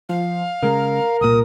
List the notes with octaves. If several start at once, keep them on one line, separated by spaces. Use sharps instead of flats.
F3 F5
C#3 G#3 A#4
C2 A#2 D#6